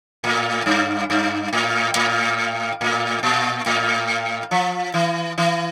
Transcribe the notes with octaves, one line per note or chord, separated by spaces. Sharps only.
A2
G2
G2
A2
A2
A2
A#2
A2
F3
E3
E3